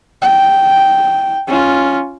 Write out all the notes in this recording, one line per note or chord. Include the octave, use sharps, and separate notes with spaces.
G5
C#4 F4